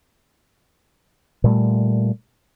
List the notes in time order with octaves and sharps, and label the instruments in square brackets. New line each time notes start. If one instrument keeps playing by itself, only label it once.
[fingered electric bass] A#2 G3 A3